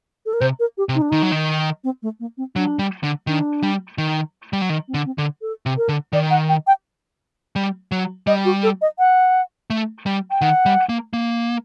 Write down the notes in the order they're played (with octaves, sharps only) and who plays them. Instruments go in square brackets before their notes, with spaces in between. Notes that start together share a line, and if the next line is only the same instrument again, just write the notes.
[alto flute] A4
A#4
[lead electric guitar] C3 [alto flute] C5
[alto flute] A#4
G4
[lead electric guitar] C3
[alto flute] D#4
D4
[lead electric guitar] D#3 [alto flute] D#4
[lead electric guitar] F#3
D#3
[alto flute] C4
A3
A#3
C4
[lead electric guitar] F#3 [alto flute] D4
[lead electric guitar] G3
D3
[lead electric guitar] D#3 [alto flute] D4
[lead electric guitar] G3
D#3
G3
F#3
D#3
[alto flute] C4
[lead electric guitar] D3
[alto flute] C4
[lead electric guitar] D3
[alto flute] A4
[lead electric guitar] C3
[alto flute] A#4
[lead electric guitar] D3
[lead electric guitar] D#3 [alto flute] D5
[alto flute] F#5
G5
G5
[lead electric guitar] G3
F#3
[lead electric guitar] G3 [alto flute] D#5
[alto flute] F#4
A4
D#5
F#5
[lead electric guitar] A3
G3
[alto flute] G5
[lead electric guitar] D#3 [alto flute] F#5
[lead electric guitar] G3
A#3
A#3